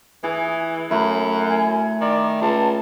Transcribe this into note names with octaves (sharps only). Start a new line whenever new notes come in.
E3 G#4
F#2 A3 E4
G#5
D#3 D5
C#2 A5